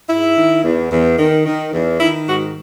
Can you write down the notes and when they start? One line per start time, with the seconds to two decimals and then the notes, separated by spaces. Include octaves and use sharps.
0.09 G#2 E4
0.36 D#3
0.63 E2
0.91 E2
1.18 D#3
1.46 D#3
1.73 E2
2.00 D#3 E4
2.28 G#2 F#4